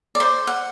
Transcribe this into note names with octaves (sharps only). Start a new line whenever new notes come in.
D5
C5
F#5